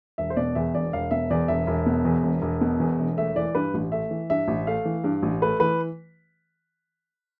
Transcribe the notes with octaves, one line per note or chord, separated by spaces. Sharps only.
E1 E5
C5
B2 D5
E2 E5
E1 D5
E1 F5
B2 E5
E2 D5
E1 E5
E1
B2
E2
E1
E1
B2
E2
E1
A3 E5
E3 D5
G2 B4
A1
A3 E5
E3
G2 E5
A1
A3 F5
E3
G2
A1
A3 B4
E3 B4